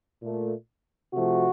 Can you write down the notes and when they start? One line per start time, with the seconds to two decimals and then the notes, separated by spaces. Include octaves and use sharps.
0.20 A#2 A3
1.14 C3 F3 A3 F#4